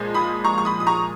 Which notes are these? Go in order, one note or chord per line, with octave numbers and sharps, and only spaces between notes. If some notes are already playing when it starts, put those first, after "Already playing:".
Already playing: A#2 F3 G#3
B5 D#6
A#5 C#6
C#6
B5 D#6
D#6
A#5 C#6